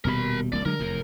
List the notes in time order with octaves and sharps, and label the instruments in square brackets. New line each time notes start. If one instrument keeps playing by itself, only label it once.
[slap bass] D#1 B2 G3 [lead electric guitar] A#4 B5
[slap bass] D#1 C2 A#3 [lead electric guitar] D5
[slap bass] D3 F#3 G#3 [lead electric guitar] A#4
[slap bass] F1 E2 A2